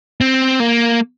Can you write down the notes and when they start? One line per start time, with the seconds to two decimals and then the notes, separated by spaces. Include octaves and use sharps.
0.21 C4
0.60 A#3